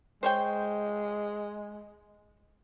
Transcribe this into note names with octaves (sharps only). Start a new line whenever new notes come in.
G#3 C5 C#5 G5